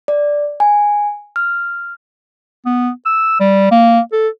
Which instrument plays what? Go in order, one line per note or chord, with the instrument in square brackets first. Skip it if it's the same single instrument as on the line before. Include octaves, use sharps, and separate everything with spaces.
[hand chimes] D5
G#5
F6
[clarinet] B3
E6
G3
A#3
A4